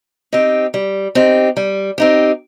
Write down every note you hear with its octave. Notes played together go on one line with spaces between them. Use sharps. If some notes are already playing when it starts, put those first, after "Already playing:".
C4 D#4 G4
G3
C4 D#4 G4
G3
C4 D#4 G4